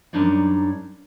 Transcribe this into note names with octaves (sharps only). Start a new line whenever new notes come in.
F#2 G3 D4 D#4 C#5 D5